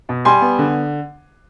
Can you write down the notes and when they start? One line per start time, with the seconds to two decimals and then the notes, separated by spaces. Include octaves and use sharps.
0.09 B2
0.25 G3 G#5 C6
0.41 B3
0.59 D3